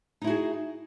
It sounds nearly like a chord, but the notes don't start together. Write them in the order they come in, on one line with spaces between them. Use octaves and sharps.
D#4 E4 F#4 G#4